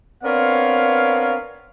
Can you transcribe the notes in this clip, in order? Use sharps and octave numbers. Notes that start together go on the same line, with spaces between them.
B3 C4 D4 A#4 C#5 F5